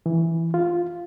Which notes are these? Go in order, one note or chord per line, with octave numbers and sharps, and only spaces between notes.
E3
F4